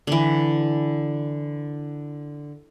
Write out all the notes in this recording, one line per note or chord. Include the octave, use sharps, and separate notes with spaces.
D3 E3